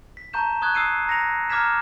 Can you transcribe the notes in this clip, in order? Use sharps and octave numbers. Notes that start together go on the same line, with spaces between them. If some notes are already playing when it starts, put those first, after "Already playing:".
B6
A5 A#5 C#6 G6 E7
C#6 D#6 F#6 G#6
D#6 E6 C7 C#7 D#7
A#5 A#6 C#7 F7
A#5 D6 F6 G#6 B6 E7